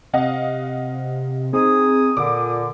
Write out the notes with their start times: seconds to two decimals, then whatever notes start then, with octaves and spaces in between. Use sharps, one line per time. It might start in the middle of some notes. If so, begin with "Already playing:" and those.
0.13 C3 D#5 F5 F#5
1.53 C4 D#4 G#4 D#6
2.17 A#2 D3 D6 D#6